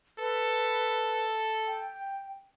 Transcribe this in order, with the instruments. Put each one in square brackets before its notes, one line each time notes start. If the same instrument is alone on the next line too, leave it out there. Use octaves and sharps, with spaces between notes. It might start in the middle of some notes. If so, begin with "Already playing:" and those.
[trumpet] A4 [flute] B4
[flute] G5